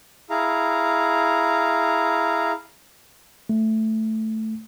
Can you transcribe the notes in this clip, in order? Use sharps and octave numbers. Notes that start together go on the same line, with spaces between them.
E4 G#4 F5 A#5
A3